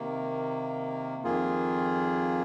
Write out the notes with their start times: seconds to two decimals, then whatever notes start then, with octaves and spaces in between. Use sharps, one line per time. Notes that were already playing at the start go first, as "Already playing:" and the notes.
Already playing: C3 D#3 A#3
1.23 F2 D#3 A#3 F4 G#4